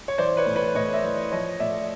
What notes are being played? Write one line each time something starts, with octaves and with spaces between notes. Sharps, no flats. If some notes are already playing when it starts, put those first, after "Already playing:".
C#5
E3 C5 D5
B4 C#5
A2
B4 C#5
A2 C#5 D#5
D5 E5
E3
F3 C#5 D#5
A2 D5 E5